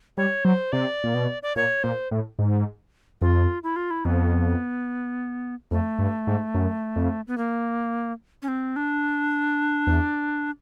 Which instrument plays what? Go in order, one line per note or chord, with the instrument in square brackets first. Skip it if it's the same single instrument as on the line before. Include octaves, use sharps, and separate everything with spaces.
[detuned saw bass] G3 [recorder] C#5
[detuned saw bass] F#3 [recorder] C5
[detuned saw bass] C3 [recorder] D5
[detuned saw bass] A#2
B2
[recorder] D5
[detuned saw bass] A#2 [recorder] C#5
[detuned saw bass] A#2 [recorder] C5
[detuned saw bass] A2
G#2
[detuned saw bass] F2 [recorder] F4
[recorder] E4
F4
E4
[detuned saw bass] F2 [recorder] B3
[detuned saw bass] F2 [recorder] A3
[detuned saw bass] G2
G#2
F#2
F2
[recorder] B3
A#3
C#4
C4
D4
[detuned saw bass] E2